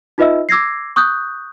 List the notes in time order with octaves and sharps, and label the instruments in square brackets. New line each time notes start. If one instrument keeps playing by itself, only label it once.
[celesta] D#4 F4 B4 D#5 E5 E6
D6 E6 G#6 A#6 C7
C#6 D#6 F#6 G6